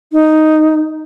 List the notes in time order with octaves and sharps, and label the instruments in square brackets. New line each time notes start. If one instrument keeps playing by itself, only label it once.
[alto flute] D#4